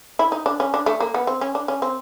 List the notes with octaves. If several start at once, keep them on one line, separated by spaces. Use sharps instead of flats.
E4
D#4
D4
C#4
D4
A3
A#3
B3
C4
C#4
D4
C#4
C4